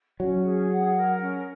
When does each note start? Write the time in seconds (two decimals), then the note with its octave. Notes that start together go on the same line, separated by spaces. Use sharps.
0.20 F#3 C#4
0.45 G#4
0.70 F#5
0.95 A#4
1.21 C#4